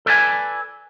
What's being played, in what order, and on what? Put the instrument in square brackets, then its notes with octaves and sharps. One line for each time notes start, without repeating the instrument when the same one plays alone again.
[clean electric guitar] A4 B4 D5 F5 G#5